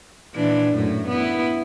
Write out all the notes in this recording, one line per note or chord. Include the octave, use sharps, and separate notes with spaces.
A#2 E3 D4
F#2 A2 A3
B3 E4